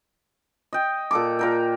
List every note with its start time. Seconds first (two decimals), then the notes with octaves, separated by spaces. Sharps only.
0.73 D#5 G5
1.11 A#2 A4 D6
1.39 A#2 A#4 G5